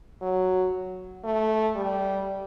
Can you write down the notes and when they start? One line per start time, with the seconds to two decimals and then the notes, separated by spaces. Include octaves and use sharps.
0.22 F#3
1.24 A3
1.75 G3